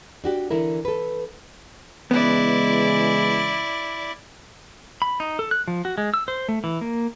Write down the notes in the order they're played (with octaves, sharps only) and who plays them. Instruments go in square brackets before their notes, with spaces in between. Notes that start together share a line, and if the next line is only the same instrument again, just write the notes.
[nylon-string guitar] D4 F#4 G4
D3 E3 E4 A#4
A4 B4
[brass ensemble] C#3 E3 G#3 [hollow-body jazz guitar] B3 [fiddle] E4 D5
[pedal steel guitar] B5
D#4
A4
F#6
F3
F#4
G#3
E6
C5
A3
E3
A#3